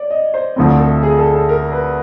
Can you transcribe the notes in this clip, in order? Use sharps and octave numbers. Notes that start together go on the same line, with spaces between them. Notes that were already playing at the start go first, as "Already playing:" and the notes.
Already playing: C#5 D5
D#5
C5
D2 D3 F3 A3 C4
A4
G#4
A4
A4
A#4
B4